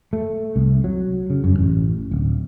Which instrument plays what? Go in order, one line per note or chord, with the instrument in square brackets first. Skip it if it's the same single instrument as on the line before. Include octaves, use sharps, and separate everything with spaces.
[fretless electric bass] A3
C2
F#3
C#3
F#2
A1
D1